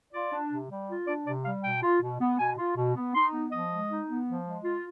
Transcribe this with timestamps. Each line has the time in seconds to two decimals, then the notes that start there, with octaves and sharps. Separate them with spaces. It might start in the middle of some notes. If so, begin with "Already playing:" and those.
0.13 F4 D5
0.32 D4
0.51 C3
0.70 G3
0.89 F4
1.07 D4 D5
1.26 C3 D5
1.45 G3 F5
1.63 B2 G5
1.83 F4
2.01 B2
2.20 B3
2.39 B2 G#5
2.57 F4
2.76 B2
2.95 B3
3.15 D#4 C6
3.33 B3
3.51 F3 D#5
3.71 G#3
3.89 D#4
4.08 B3
4.27 F3
4.46 G#3
4.64 F4